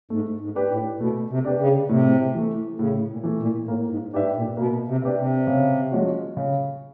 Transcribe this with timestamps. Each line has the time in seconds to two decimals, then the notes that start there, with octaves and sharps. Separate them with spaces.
0.10 G#2 A3
0.41 G#2
0.55 D4 G4 B4
0.70 A2
1.00 B2 A3
1.30 C3
1.45 D4 G4 B4
1.60 C#3
1.89 A2 C3
2.35 E3 A3
2.79 A2 C#3
3.09 A#2
3.24 E3 A3
3.39 A#2
3.68 A2 A#3
3.91 G#2
4.13 G#2 D4 G4 B4 E5
4.36 A#2
4.57 B2 A#3
4.88 C3
5.02 D4 G4 B4 E5
5.18 C3
5.47 C#3
5.91 F3 G#3 C#4 F#4
6.37 C#3